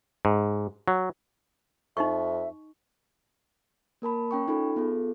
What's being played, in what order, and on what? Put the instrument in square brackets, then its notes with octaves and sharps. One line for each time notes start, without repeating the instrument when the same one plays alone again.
[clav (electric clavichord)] G#2
F#3
[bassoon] F2 [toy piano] D#4 D#5 C#6 [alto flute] E5
[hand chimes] A#3 A#4 A5 B5
C#4 G5 C#6
D#4 F4 A4 B5
B3 F4 G#4 A4